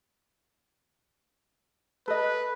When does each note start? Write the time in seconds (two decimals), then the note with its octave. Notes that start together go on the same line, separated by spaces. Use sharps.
2.08 A4 B4 D#5